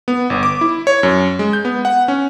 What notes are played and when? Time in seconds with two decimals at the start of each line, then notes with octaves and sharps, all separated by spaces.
0.08 B3
0.30 G1
0.43 D6
0.61 E4
0.87 C#5
1.03 F#2
1.39 G#3
1.53 G6
1.65 B3
1.85 F#5
2.08 C#4